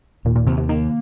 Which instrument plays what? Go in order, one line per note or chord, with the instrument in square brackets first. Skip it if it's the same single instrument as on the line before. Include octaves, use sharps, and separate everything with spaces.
[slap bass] D#2 [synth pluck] A#2
[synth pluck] A#2
[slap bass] D#2 [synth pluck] C3
[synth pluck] C3
[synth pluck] D#3 [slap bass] A#3